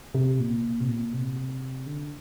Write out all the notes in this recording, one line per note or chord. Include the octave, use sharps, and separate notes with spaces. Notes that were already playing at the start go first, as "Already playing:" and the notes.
C3
A#2
C3
A#2
C3
D3